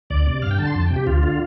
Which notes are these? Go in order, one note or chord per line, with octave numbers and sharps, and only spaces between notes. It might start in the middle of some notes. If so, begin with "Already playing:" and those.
D2 D5
C3
G2 F5
G5
D3 A5
C6
F2 A5
G5
C3
G4
D2 F4
D3